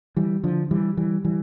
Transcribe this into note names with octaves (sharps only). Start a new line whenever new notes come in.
E3 G3
D3 F3
E3 G3
E3 G3
E3 G3